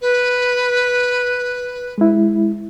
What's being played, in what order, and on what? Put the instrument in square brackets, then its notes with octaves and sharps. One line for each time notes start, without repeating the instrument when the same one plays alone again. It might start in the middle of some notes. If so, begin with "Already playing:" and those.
[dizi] B4
[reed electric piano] G#3 E4